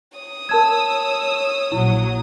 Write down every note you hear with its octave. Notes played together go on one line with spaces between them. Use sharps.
C#5 D#6
A#4 A5 E6 G#6
A#1 F#3 E4